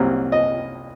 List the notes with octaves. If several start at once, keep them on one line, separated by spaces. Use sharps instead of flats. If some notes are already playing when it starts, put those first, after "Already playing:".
Already playing: C2 C3 F#3 A#3
D#5